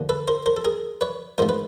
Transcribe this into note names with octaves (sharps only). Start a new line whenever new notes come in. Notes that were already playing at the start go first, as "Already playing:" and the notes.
Already playing: D#2 D3 F3
A4 B4
A#4 C5
A#4 C5
A4
G#4 A#4
B4 C#5
A1 G#2 F3 A#4 C5
B4